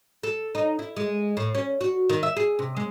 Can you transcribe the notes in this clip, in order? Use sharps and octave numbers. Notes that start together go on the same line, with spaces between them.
A4
D#4
E4
G#3
A2
C#4
F#4
D#3
E5
G#4
C3
G#3